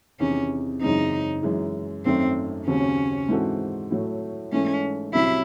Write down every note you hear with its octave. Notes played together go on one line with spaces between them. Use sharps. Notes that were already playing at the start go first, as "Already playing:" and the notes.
E2 C3 D#3 C#4
F#2 C#3 E3 G#3 C4 D#4
F#2 E3 G#3
G#1 F#2 D#3 A3 C4
D#2 C#3 F#3 C4 C#4
G#2 E3 C4 F#4 A4
A2 F#3 A3
G#2 E3 A3 C#4 D#4
C2 C3 F#3 C#4 E4